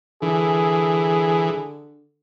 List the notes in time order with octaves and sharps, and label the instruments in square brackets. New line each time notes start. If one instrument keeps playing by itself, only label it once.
[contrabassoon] D3 [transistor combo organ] E3 [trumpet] G#4